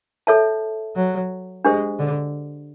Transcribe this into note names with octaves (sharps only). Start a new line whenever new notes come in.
A4 C#5 E5 A5
F#3
G#3 D4 G4 C5
D3